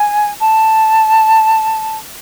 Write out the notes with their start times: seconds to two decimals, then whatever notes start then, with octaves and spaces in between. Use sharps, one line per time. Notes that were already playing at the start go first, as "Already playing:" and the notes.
Already playing: G#5
0.40 A5